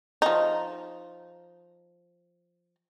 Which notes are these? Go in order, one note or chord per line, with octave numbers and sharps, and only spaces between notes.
F3 D#4